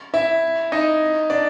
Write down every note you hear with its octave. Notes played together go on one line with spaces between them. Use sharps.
E4 E5
D#4 D#5
D4 D5